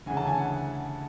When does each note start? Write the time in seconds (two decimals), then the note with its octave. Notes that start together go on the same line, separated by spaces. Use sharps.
0.06 D2 C#3 E3 G#5
0.17 A5
0.27 G#5
0.38 F#5